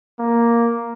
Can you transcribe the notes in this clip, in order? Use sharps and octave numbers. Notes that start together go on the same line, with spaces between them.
A#3